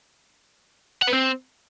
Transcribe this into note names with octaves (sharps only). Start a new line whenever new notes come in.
F#5
B4
C4